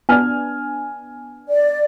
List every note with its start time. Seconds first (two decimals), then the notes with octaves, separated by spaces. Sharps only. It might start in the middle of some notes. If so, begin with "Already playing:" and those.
0.09 B3 D4 G#5 F6
1.50 D5